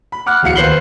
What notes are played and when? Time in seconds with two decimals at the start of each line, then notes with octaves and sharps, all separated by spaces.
0.12 B5
0.26 F#5 D6 F6 F#6
0.43 D1 E2 F5 C#7
0.56 D#2 B4 C5 C7 F#7 G7